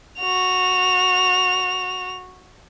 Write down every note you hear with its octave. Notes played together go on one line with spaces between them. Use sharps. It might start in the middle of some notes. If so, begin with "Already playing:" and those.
F#4 F7